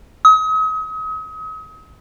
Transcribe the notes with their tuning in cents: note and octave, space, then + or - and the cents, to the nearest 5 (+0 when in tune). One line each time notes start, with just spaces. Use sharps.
D#6 +40